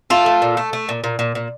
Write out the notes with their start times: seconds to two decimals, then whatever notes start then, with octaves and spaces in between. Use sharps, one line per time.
0.10 A3 F4 A4
0.26 A3
0.42 A#2
0.57 A3
0.73 A3
0.89 A#2
1.04 A#2
1.19 A#2
1.35 A#2